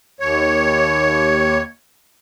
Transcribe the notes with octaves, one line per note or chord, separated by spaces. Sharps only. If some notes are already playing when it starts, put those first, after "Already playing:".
D#2 C#5